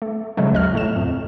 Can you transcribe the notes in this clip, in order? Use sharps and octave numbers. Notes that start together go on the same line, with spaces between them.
A3
C#3 F#3 G#3 A3
G#1 D#2 D#5 F6
A2 A3 E7
F2